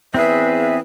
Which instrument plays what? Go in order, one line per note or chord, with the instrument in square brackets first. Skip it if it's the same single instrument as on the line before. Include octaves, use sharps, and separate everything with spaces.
[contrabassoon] E2 [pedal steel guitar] C4 G#4 [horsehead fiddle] B4 [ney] E5